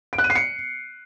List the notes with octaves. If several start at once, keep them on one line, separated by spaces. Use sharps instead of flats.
D7
F#6
D#7
C7
C#7